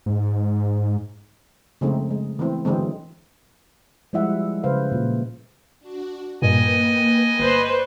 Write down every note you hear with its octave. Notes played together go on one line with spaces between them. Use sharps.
G#2
C#3 F3 G#3 A3 C4 D#4
G#3
E3 A3 B3 C4 E4
D3 E3 F#3 G#3 C4
F3 G3 G#3 E4 E5 F#5
C#3 B4 C5 F5
A#2
D4 F#4
G2 A#2 A#3 B4 D#5 G5 G#5
G1 B4 C5 D5 C#6